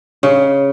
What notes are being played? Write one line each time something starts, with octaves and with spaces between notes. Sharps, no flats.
C#3